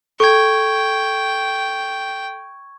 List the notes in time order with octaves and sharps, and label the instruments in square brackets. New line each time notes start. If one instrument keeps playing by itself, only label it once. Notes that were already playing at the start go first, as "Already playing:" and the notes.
[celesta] A4 [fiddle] G5 [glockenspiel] C#6 G#6